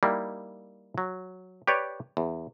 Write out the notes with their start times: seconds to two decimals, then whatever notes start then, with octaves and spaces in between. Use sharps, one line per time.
0.03 G3 A#3 D#4 E4
0.98 F#3
1.67 G4 B4 C#5 D5
2.17 E2